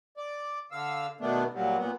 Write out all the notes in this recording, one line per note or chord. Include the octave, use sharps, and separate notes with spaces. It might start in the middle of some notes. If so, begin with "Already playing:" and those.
D5
D3 F5 E6
B2 D#3 A3 B3 D4
A#2 F#3 G3
A#2 B3